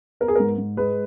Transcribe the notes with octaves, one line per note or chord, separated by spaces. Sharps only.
B3 A#4
G#4
G#2 A#4
G#2
G#3 B4